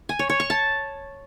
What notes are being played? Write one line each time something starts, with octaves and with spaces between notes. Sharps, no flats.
G#5
C#5
C#5
C#6
A5